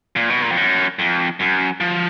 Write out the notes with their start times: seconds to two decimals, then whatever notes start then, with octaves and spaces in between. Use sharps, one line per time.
0.16 A#2
0.30 B2
0.42 A#2
0.51 F2
0.57 F#2
0.99 F2
1.40 F#2
1.80 F3